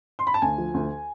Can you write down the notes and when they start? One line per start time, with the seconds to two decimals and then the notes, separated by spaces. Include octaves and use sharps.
0.19 C6
0.27 B5
0.34 A5
0.42 D2 G#5
0.58 F3
0.74 D2